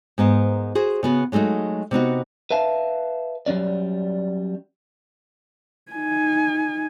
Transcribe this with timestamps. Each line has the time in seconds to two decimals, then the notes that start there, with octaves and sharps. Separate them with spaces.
0.18 G#2 B3 A#4 C5
0.75 F#4 G#4 C5
1.03 C#3 B3 F#4
1.32 F#3 G#3 A3 D#4 F#4
1.91 C3 B3 D#4 F#4
2.51 B4 E5 F5 A5
3.46 F#3 G3 C#4 D5
5.92 D#4 G#5